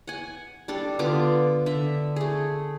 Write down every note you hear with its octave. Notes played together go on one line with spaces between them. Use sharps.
F#5 G#5
G3 D4 A4
D3 B3 F4 D6
D3 E5
A3 G#4